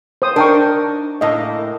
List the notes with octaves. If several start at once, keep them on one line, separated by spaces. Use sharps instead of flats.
C5 D#6
D4 D#4 A#4 G5 C#6
A2 A#3 D#5